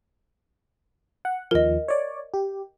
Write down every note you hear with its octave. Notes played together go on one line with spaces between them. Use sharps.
F#5
D#2 F3 A#4 D#5
C#5 D5
G4